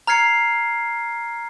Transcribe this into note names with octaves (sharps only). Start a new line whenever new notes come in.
A#5 F6 G#6 C7 C#7